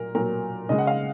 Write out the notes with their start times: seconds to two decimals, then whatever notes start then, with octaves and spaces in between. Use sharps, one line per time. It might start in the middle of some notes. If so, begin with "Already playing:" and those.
Already playing: A#2 F#3 A#4
0.15 A#2 F#3 A#4
0.69 C#3 G#3 D#5
0.78 F#5
0.87 F5